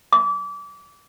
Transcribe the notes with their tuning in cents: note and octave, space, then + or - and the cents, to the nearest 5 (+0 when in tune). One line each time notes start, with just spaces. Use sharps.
D6 -30